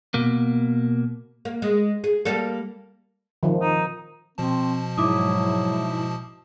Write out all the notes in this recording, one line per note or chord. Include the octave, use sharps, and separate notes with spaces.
B2 A#3
A#3
G#3
G#4
G3 A#3 A4
D#3 F3
D#4
B2 F3 C4 A5
G#2 F#3 E4 D6 D#6